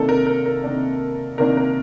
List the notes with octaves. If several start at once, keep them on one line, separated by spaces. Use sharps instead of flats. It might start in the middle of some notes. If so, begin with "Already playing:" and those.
Already playing: C3 D#3 A#3 D4 A4
A#4
A#4
A#4
C3 D#3 A#3 D4
C3 D#3 A#3 D4 A#4
A#4